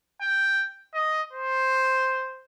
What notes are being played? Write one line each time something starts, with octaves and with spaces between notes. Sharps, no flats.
G5
D#5
C5